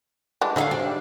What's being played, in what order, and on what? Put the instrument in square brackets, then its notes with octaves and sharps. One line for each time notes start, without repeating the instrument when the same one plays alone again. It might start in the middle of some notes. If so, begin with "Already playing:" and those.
[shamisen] E3 G3 G#3 [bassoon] D4
[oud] D3 E5 F5 [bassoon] F#3 [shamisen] D#4 G#4
[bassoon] C3 [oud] D4
[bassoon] G3